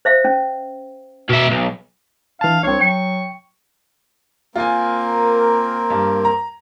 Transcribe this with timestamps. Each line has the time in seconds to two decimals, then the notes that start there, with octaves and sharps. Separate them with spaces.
0.05 C5 E5 F5
0.25 C#4
1.29 B2 E5
1.50 B1
2.41 E3 D4 F5 A5
2.63 C2 C4 D4 C#5
2.81 F#3 G5 C#6
4.55 A#3 C4 F4 A#4 G#5
5.90 G2
6.25 A#5